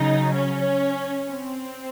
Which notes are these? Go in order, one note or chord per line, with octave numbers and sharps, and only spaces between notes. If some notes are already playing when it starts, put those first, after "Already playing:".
Already playing: C#3 F#3 D#4
C#4
C4